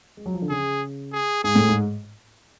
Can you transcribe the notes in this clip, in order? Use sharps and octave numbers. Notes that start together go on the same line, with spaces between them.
G#3
F#3
F3
D3
C#3 G#4
G#4
G#2 G#4
A2
G#2